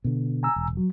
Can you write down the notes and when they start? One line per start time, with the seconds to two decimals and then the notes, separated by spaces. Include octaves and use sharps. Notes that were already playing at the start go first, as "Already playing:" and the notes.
0.04 B2 D3
0.43 G#5 A#5 E6
0.56 E1
0.77 F#3